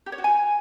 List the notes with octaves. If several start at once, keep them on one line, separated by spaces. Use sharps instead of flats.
G4
C#5
F#4
G#5